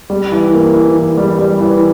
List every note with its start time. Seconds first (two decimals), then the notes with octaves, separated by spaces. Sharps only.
0.10 G3
0.32 E3
0.53 A#3
0.74 E3
0.96 E3
1.17 G3
1.39 G3
1.60 E3